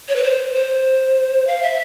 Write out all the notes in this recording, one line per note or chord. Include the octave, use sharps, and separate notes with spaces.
C#5
B4
C5
C5
F5
E5